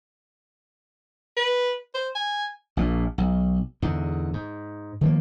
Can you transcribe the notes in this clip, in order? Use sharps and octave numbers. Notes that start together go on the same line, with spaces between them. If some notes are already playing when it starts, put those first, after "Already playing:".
B4
C5
G#5
A#1 A#2
B1
E2 G#2 D3
G#2
D#3 F3 A#3